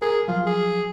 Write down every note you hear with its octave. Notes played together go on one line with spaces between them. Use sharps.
G#4 A#4 G#6
F3 F#3 F4
G#4